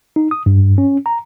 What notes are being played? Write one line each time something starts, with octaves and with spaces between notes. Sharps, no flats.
D#4
D#6
G2
C#4
A#5